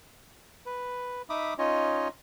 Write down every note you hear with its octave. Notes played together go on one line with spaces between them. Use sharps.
B4
D#4 E5 B5 D6 D#6
C#4 D#4 F4 C#5 D#5